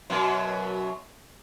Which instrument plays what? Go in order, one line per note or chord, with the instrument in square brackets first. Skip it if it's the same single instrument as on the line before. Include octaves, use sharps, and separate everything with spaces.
[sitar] F#2 B2 F#3